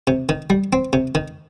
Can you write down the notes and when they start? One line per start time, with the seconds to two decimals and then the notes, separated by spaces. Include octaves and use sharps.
0.07 C3
0.29 D#3
0.50 G3
0.73 C4
0.93 C3
1.15 D#3